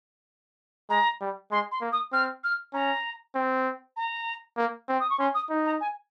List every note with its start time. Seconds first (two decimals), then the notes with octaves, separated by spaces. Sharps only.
0.90 G#3 A#5
1.21 G3
1.51 G#3 C6
1.71 C6
1.81 A#3
1.92 D#6
2.12 C4 F6
2.43 F6
2.73 C#4 A#5
3.35 C4
3.96 A#5
4.57 A#3
4.89 C4
5.00 D#6
5.09 C#6
5.19 C#4 C6
5.34 D#6
5.50 D#4
5.65 A#5
5.80 G#5